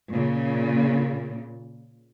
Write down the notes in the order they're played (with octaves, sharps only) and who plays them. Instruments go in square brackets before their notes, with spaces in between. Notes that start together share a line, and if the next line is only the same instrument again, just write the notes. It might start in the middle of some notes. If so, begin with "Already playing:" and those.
[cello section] A#2 C#3